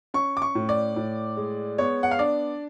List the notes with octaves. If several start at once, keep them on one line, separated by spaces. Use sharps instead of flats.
C#4 C#6
D6
C#6
A2
D5
A2
G#3
B3 C#5
F#5
F5
D4 D5